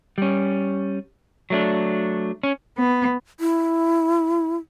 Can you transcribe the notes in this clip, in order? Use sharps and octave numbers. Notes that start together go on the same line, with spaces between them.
G3 C#4
F#3 A3 D4
C#4
B3
E4